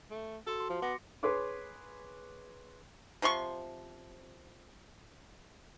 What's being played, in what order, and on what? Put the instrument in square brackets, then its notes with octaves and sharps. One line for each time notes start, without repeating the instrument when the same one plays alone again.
[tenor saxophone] A3
[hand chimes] F#4 A5 C6 [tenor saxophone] A4
[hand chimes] F#4 C6
[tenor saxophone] F3
[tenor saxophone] B3 [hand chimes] D6 A#6 C#7
[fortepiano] G#4 B4 C#5 C6 D6
[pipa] C3 F3 C6 C#6